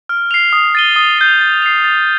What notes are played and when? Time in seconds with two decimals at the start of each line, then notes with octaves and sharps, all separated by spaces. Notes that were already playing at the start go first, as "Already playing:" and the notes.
0.09 F6
0.31 C7 F7
0.53 D#6
0.75 A6 D#7 G7
0.96 D#6
1.19 G6 C7
1.40 A6
1.62 C7 F7
1.84 A6